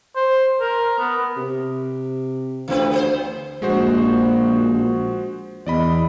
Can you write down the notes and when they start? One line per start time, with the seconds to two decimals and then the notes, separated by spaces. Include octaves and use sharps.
0.16 C5
0.61 A#4
0.99 B3
1.37 C3
2.68 D2 E3 C4 B4
2.91 B3 G#4 C5
3.62 A#1 G#3 F#4 C5
5.66 E2 D5 D#5 B5